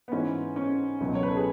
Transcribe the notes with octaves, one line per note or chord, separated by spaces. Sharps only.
B3
G#2 E3 C#4
C#4
C#2 B2 F#3
C#5
B4
A4
G#4